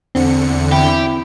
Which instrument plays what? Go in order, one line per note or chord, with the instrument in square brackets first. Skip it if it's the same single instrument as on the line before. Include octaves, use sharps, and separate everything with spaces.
[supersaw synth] E2 D3 C#7 [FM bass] C4
[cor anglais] E4 [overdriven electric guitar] G4